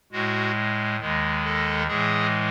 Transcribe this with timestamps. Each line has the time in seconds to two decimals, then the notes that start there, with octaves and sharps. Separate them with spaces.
0.12 A2 G#3 F#4
0.99 D#2 D#3 G#3
1.44 A4
1.87 A2 E3 G#3 G#4